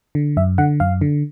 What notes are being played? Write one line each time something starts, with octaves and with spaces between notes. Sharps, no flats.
D3
F#2 E5
D3 F#5
F#2 F5
D3